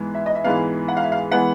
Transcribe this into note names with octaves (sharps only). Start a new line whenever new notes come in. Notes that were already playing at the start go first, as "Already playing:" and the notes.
Already playing: G#2 E3 G#3 B3
E5
D#5
E5
G#2 E3 G#3 B3 F5
F#5
F5
E5
F5
E3 G#3 B3 F#5